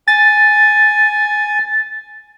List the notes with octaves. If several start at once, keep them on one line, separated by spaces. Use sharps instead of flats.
G#5 A6